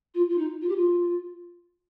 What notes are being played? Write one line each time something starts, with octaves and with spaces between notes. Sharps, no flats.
F4
F4
D#4
F4
G4
F4